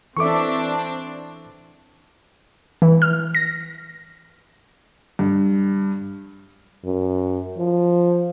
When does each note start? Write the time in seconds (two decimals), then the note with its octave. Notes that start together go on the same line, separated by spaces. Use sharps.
0.17 E3 C4 D4 A4 E5 C#6 D6
2.82 E3
3.02 F6
3.35 A#6
5.19 G2
6.84 F#2
7.58 F3